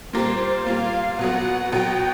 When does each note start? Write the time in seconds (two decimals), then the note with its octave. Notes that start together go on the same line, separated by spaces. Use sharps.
0.13 A#2 G3 A#3 C5
0.66 A#2 G3 A#3 F5
1.19 B2 F#3 B3 F#5
1.72 B2 F#3 B3 G5